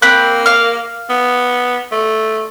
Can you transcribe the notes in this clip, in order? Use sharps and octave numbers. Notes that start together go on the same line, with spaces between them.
A#3 C4 B5 F#6
F5 F6
B3
A3